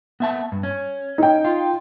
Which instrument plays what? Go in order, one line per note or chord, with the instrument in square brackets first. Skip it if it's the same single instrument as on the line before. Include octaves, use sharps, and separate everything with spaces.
[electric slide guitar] B3 E5 A5
G2
C#4
[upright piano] D#4 G5
[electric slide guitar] F4